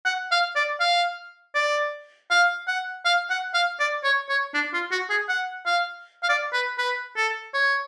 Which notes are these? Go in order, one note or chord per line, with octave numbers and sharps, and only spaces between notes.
F#5
F5
D5
F5
D5
F5
F#5
F5
F#5
F5
D5
C#5
C#5
D4
F4
F#4
G#4
F#5
F5
F5
D5
B4
B4
A4
C#5